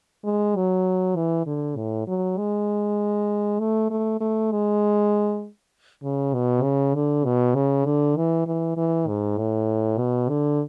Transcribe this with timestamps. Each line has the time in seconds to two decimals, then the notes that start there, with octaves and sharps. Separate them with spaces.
0.24 G#3
0.56 F#3
1.16 E3
1.46 D3
1.76 A2
2.07 F#3
2.37 G#3
3.59 A3
3.90 A3
4.20 A3
4.51 G#3
6.03 C#3
6.34 B2
6.63 C#3
6.95 D3
7.25 B2
7.54 C#3
7.85 D3
8.16 E3
8.47 E3
8.77 E3
9.08 G#2
9.38 A2
9.98 B2
10.29 D3